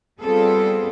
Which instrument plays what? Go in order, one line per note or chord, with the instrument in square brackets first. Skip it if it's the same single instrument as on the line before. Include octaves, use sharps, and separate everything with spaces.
[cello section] G3 B3 C4 F4 G#4 A4